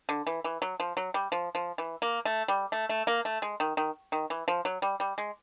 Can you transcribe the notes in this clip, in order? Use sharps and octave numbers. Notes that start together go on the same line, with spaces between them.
D3
E3
E3
F#3
F3
F#3
G3
F3
F3
E3
A#3
A3
G3
A3
A3
A#3
A3
G#3
D#3
D#3
D#3
E3
F3
F#3
G3
G3
G#3